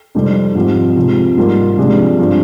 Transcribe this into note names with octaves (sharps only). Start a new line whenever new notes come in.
F2 C3 D#3 G3 C4
G#2 F3 C4 G4
C3 F3 G#3
G#2 G3 A#3 F4 A#4
C3 F3 G#3 D4 G4
G2 F3 C4 G4